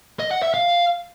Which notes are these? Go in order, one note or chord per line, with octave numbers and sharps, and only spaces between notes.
D#5
F#5
E5
F5